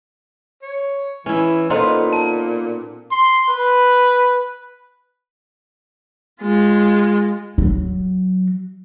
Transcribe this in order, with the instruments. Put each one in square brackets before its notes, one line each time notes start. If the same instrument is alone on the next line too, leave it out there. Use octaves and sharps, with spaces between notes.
[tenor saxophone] C#5
[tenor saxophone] E3 [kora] C#4 E4
[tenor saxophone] A#2 [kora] B3 D#4 F4 [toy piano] A4 C5 C6
[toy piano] A5
[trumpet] C6
B4
[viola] G#3 F4
[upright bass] F#3